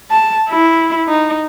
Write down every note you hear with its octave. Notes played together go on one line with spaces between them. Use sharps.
A5
E4
D#4